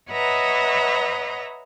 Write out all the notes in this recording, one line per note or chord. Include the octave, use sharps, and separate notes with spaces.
B4 C#5 D#5 E5 F#5 A#5